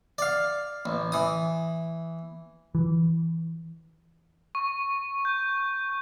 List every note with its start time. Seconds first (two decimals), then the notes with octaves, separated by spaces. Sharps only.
0.18 D5 F5
0.86 A1
1.12 E3 D#6
2.75 E3
4.55 C#6
5.25 G6